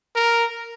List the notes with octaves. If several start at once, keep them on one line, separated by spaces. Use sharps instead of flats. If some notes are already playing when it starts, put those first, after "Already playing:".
A#4